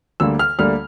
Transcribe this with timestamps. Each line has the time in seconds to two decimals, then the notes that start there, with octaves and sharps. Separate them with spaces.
0.20 D2 D3 G3 A#3 E6
0.39 F6
0.59 D2 D3 G3 A#3 F6